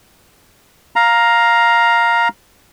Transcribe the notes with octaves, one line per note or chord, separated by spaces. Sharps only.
F5 A#5